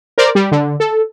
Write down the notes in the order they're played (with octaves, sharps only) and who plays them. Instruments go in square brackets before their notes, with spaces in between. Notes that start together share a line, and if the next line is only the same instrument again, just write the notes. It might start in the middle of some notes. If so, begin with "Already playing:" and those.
[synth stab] A#4 C5 D5
G3
D3
A4